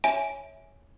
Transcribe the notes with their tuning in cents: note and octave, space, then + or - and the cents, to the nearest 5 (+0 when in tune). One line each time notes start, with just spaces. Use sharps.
C#5 +0 E5 -15 G#5 +0